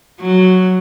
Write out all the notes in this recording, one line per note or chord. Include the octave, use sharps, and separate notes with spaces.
F#3